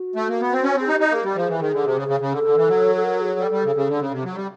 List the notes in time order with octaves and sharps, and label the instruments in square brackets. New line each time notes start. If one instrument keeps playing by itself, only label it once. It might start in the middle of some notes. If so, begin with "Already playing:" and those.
Already playing: [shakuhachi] F#4
[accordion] A3
A#3
B3
C4
C#4
[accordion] C4 [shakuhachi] G#4
[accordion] D#4 [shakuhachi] G4
[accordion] D#4
[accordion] A#3 [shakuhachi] G#4
[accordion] G3 [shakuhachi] G4
[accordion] F3
[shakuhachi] G#4
[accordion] E3
[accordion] D#3 [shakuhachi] G#4
[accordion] D3
C3
C#3
C#3
C#3
[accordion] D3 [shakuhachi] A4
[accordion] D3
E3
F#3
[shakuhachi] A4
A#4
G#4
[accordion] G3 [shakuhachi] A4
[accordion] G3
C#3
C#3
D3
C#3
C3
F#3
G3